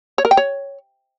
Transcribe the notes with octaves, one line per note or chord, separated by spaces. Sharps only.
C#5
A#4
G5
C#5